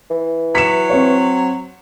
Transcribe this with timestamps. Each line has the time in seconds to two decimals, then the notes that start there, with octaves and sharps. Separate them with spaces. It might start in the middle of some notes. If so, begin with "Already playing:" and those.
0.11 E3
0.55 F#3 B6 C#7 E7
0.90 C4 C#5